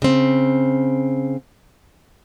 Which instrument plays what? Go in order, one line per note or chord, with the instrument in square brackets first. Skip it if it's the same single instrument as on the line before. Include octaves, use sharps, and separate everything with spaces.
[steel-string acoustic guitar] C#3 C4